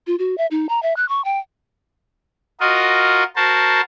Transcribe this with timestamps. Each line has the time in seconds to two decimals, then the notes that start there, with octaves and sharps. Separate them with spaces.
0.07 F4
0.19 F#4
0.38 E5
0.51 D#4
0.69 A#5
0.83 E5
0.96 F#6
1.09 C#6
1.25 G5
2.60 F4 F#4 A#4 D#5
3.36 F#4 A#4 C5 A5